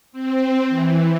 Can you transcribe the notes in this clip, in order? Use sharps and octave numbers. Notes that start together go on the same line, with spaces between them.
C4
E3